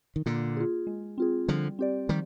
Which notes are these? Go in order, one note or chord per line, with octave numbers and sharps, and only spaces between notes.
D#3
A#2 D3 A#3
F4 G#4
G#3
C4 F4 G#4
D3 F3 G3
C4 G4 D5
D#3 F3 G3